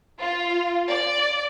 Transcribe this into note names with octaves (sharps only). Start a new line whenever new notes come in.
F4
D5